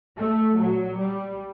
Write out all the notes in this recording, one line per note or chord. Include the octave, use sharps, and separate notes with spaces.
A3
A#2 F#3
G3